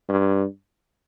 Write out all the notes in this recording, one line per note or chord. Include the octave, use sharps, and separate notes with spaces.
G2